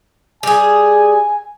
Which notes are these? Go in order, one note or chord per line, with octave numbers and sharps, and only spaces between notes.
G3 G#4 G#5